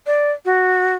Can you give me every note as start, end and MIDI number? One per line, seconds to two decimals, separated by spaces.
0.07 0.32 74
0.45 0.95 66